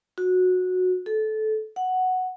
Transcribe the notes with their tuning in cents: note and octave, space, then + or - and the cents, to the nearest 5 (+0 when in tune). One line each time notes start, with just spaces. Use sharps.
F#4 -15
A4 -20
F#5 +0